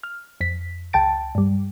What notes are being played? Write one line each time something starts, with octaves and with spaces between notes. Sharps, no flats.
F6
F2 B6
C#2 G5 A5 A6 D7
G2 G3